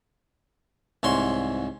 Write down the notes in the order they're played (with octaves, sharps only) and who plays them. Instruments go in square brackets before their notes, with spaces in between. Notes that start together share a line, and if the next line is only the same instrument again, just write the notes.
[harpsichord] C2 G#2 C#5 C6